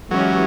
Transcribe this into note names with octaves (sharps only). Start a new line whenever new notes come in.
E3 F#3 G#3 C#4 E4 G4